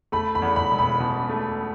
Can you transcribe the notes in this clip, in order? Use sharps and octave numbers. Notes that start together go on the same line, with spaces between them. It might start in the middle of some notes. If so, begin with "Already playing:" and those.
A3 B5
B5
E2
B5
E1
B5
B2
A3